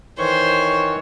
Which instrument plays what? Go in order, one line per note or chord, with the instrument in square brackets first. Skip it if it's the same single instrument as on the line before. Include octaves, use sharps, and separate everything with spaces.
[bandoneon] D#3 E3 [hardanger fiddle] C5 [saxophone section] C#5